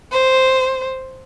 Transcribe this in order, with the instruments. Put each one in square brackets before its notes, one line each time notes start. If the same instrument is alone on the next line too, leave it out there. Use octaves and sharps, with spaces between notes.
[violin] C5